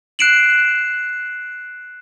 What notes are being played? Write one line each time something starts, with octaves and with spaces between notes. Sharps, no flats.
F#6 C7 D7 E7 F#7